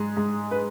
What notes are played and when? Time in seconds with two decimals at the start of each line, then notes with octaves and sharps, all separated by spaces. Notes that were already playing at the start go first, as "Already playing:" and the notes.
Already playing: G#2 G#3 G#4
0.17 G#2
0.51 B4